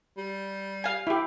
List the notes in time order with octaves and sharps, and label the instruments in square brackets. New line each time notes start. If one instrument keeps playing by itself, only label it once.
[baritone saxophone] G3
[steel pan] F5 G#5
E4 G4